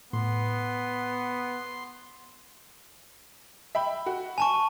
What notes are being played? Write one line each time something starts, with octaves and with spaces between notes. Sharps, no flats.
A2 B3 C6
E5 G5 B5
F#4
G#5 A5 C#6